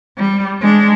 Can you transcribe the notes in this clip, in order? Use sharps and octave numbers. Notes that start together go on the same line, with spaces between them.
G3
G#3 D4